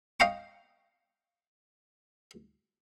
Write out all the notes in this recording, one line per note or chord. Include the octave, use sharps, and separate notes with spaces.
D#5 F5 G5 A#5 C#6